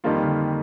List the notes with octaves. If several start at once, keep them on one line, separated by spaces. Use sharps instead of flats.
F2 D#3 G3 A#3 F4
D3